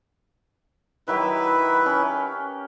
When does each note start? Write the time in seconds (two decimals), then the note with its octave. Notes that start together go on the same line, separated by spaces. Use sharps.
1.08 D#3 F#3 E4 G4 B4
1.86 C#4 G4